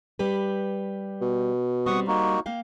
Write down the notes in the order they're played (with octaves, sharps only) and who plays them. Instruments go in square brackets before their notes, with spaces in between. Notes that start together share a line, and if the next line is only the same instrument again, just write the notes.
[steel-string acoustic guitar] G3 G4 B4
[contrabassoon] B2
[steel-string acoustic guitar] G3 C4 [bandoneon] F#5 C#6 D#6
[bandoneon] A#3 D#4 F#4
[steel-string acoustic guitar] A#3 F5 G5